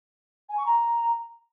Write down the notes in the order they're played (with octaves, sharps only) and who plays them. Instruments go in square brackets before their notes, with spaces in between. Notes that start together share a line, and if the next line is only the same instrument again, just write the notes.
[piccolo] G#5
C#6
A#5